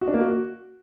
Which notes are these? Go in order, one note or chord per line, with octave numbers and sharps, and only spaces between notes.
F#4
D4
A#3
F#4